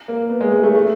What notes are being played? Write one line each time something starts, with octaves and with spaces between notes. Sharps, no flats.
A#3
B3
G#3
G#3
A3
A3